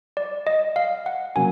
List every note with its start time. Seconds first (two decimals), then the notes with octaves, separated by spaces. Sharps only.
0.17 D5
0.47 D#5
0.76 F5
1.06 F#5
1.35 C#3 F#3 A#3 G#5